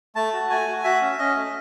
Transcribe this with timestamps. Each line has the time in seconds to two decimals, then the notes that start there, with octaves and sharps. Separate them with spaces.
0.16 A3 A5
0.33 F#4
0.50 A3 G#5
0.67 F#4
0.84 F#4 E5
1.01 C#4
1.18 C#4 D#5
1.35 A3